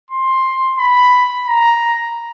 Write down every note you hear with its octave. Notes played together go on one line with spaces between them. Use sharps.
C6
B5
A#5